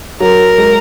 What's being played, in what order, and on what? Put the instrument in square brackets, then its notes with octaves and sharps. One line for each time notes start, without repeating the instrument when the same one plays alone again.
[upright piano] F#3 [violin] A#4
[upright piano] G#3